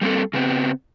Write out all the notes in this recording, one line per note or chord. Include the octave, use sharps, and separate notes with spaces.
G3 A#3 C4 A4
C#3 B3 C4